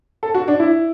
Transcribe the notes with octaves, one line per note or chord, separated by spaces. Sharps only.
A4
F#4
D4
E4